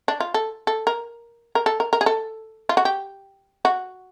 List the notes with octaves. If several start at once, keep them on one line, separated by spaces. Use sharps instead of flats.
D4
F4
A4
A4
A#4
A#4
A4
A#4
A#4
G#4
A4
F4
F#4
G4
F#4